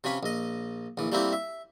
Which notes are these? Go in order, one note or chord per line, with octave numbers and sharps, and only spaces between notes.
C3 F3 C#4 B4 B5
A#1 D#5
A#1 E3
G3 A3 A#3 C4 E4 G4
E5